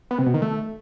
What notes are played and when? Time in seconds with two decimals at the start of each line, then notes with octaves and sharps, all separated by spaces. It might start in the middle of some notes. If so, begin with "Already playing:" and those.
0.11 B3
0.18 C3
0.26 B2
0.34 D#3
0.42 A3